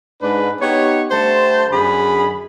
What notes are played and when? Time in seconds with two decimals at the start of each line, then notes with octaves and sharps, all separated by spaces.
0.22 G#2 D4 B4
0.61 B3 D#4 G4 C#5
1.11 D3 G3 A3 C5 A5 C6
1.71 F#2 D3 D4 G#4 B5